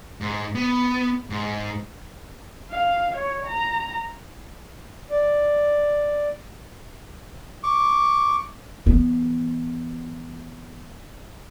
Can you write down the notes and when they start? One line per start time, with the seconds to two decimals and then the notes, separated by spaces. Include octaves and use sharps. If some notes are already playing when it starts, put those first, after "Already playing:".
0.21 G#2
0.55 B3
1.30 G#2
2.71 F5
3.15 C#5
3.47 A#5
5.11 D5
7.63 C#6 D6
8.86 E3 B3